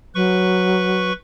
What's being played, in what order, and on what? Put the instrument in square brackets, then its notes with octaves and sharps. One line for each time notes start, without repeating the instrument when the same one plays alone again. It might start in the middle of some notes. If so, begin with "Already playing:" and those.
[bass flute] F#3 [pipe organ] B4 C#6